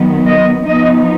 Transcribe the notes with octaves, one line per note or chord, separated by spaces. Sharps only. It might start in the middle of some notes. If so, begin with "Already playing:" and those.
Already playing: D#3 F#3 B3
D#5
F3 B3 D#4 D#5